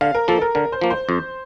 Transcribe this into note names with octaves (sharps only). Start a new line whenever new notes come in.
D3 F5
A#4
F3 A#3 A4
A#4
D3 A#4
C5
F3 A#3
C5
F2